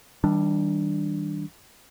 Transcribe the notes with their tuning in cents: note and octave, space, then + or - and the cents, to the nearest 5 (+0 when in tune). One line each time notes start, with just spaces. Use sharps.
D#3 +45 G3 +0 D4 +0